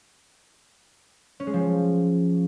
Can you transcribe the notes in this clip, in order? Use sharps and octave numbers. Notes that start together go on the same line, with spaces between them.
C#4
G#3
F3